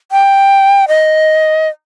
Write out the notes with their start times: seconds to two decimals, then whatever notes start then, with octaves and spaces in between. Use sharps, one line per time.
0.12 G5
0.88 D#5